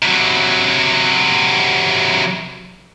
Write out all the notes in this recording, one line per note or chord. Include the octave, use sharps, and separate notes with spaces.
C3 F#3